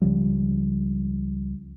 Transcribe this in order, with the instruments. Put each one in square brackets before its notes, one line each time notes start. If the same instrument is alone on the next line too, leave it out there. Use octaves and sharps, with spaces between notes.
[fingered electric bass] C#2 C#3 F3 G3